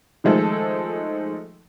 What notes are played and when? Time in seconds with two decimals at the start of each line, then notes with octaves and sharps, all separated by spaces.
0.24 D#3 F3 G#3 A3 A4